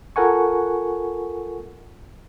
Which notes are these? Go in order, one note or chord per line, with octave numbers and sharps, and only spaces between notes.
F4 A4 A#4 F#5 G#5 C#6